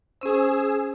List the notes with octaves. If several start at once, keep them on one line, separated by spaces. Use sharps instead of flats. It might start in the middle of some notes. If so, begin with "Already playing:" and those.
C#4 G#4 C5 E6